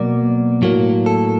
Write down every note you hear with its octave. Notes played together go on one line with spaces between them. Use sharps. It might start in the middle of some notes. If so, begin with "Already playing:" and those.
Already playing: B2 F#3 A#3 D5
A2 F#3 A#3
A4